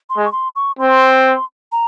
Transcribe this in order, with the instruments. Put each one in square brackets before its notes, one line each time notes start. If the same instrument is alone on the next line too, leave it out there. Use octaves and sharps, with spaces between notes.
[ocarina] C6
[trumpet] G#3
[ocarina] C#6
C6
C#6
[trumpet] C4 [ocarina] C6
[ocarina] A#5